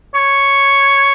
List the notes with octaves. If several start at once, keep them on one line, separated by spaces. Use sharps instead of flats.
C#5